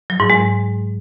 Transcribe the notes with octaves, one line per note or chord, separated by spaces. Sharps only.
F#3
G#2
G#3